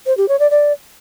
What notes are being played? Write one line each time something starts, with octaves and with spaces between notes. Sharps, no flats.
C5
G4
C#5
D5
D5